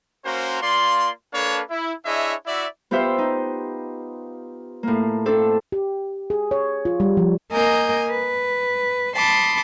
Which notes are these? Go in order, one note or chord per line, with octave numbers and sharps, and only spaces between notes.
A#3 C#4 F#4 A#4 C5
A#3 F4 D5 C6
A#3 D4 A4 B4 C#5 F5
E4
D4 E4 G#4 C#5 D#5 E5
E4 F#4 D5 E5
B3 F4 G4 C5 E5
D#4
A2 A#3
C4 D4 A4
G4
G#4
C#5
F4
G3
F3
A#3 A#4 D#5 G#5 G6
B4
A5 B5 C6 D6 D#6